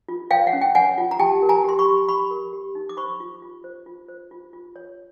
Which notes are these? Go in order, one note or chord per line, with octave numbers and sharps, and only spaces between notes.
F4
C#5 F5 G5
F#5
C#4
G5
C#5 F#5 G#5
F4
A#5
G4 G5 A5
A#4
G#5 A#5
G4 C6
B5 C#6
G4
G4 B5 C#6
A#4
G4
D#4
D6
C5 B5 C#6
F4
F4
C5
F4
C5
F4
F4
C#5